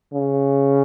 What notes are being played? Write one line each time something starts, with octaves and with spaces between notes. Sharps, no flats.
C#3